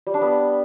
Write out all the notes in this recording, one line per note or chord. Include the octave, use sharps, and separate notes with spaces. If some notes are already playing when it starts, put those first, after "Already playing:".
G3
D4
B3